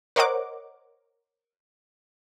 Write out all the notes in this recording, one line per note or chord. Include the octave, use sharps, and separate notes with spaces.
A#4 C5 C#5 D#5 F#5 D6